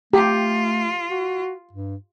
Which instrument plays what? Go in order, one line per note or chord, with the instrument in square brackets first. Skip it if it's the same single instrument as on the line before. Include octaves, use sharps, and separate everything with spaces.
[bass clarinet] A3 [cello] F4 [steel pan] G4
[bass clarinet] F#4
G2